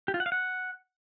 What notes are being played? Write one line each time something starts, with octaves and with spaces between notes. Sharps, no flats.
G4
F4
F#5
F5
F#5